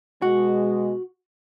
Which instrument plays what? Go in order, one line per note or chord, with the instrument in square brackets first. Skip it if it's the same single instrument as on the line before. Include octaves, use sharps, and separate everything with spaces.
[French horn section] B2 G#3 [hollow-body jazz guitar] F#4